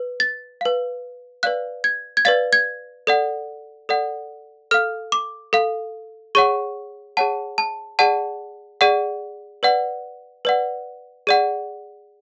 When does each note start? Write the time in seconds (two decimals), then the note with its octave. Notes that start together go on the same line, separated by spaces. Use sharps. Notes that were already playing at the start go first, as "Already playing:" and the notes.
Already playing: B4
0.20 A6
0.61 B4 F5
1.43 B4 D5 F5 F#6
1.84 G#6
2.17 G#6
2.25 B4 D5 F5 A6
2.53 G#6
3.07 A4 D5 F#5
3.89 A4 D5 F#5
4.71 A4 F5 F6
5.12 D6
5.53 A4 F5
6.35 G#4 C#5 F#5 C#6
7.17 G#4 C#5 F#5 A5
7.58 A5
7.99 G#4 D5 F#5 A5
8.81 G#4 D5 F#5
9.63 B4 D5 F#5
10.45 B4 D5 F#5
11.27 G#4 D5 F#5